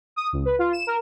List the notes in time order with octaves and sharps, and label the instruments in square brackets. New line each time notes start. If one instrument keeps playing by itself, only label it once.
[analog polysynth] D#6
C#2
B4
F4
E7
A#4